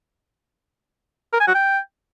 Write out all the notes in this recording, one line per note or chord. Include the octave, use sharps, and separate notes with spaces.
A#4
G#5
F#4
G5